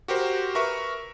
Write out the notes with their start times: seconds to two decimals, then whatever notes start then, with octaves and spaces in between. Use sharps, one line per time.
0.08 F#4 G4 A#4 C5
0.55 A#4 B4 E5 C#6